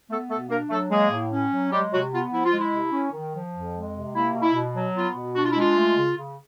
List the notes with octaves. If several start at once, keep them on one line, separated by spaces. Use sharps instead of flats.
A3 B3 A4
B2 A3 A4
A#3 D4 A#4
F#3 A3 A4
G#3 A#3 G#4
A2
C#4
F#3
G3 G#3 G4
C3 F#3 F#4
B3 F4
F3 E4
F4
G#3
E4
C3
C#4
D#3
F3
F2
G#3
C3
A#3 E4
B2
E4
B2
F#3
B3 F4
B2
D4 F#4
F4
E4
G#3 F4
A3
C#3
C#3